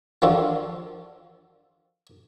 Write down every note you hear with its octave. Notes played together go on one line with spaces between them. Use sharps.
D#3 F3 D4 F4 F#4 A4